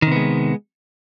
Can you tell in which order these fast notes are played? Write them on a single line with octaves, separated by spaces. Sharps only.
D#3 C3 B3 G#3